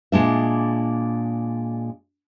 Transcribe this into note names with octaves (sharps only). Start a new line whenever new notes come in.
A#2 G#3 D4 E5